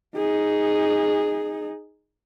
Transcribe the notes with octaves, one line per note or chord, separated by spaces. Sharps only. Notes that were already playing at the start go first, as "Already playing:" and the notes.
D#4 G#4